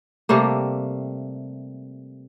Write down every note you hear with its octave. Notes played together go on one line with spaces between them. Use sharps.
C3 G3 A3 A#3